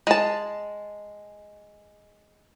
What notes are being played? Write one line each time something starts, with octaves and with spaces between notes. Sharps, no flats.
G#3 A5